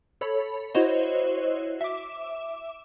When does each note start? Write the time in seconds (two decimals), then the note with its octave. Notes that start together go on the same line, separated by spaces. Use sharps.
0.21 A4 C#5 B5
0.75 E4 F#4 C5 C#5 D#5
1.81 E5 D6